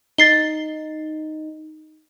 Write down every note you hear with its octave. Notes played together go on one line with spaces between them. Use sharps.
D#4 A6 C7 G7